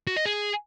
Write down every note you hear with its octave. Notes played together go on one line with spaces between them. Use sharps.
F#4
D#5
G#4